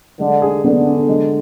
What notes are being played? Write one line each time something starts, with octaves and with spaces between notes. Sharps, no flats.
D3 G#3
G#4
D3 B3
D4
G#3